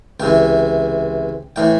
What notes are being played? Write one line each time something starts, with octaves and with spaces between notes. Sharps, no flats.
C#2 C3 E3 G5
A2 E3 G5